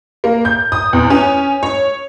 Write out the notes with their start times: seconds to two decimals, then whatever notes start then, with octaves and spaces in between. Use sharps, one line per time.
0.24 A#3
0.45 G6
0.72 D#6
0.93 E2
1.10 C#4
1.63 C#5